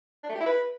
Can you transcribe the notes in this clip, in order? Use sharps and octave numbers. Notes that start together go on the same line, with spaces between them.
D4
A3
G4
E4
B4